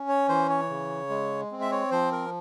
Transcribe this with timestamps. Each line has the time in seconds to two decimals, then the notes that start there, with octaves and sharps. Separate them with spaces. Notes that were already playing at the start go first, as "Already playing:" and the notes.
Already playing: C#4
0.09 C#5
0.29 E3 C5
0.49 C#5
0.69 C#3
1.10 G#3
1.52 C4
1.61 E5
1.72 C#5
1.91 F3 C5
2.12 A#4